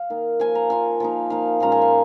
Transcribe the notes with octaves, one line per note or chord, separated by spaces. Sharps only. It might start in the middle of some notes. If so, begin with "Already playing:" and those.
Already playing: F5
D#3 A#3 D#4
F3 A#3 F4 G#5
A#5
F3 A#3 F4 G#5
F3 A#3 D#4
F3 A#3 D#4 F5
A#2 G#3 C#4 F4 A#5
G#5
F5